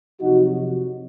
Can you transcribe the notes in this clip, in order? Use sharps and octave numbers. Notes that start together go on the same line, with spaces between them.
F2 C3 F#3 D#4 F#4